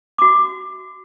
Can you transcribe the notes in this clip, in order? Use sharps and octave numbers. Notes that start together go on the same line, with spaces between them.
F#4 D6